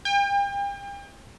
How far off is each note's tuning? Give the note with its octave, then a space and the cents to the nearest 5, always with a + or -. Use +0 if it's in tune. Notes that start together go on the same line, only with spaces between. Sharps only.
G5 +35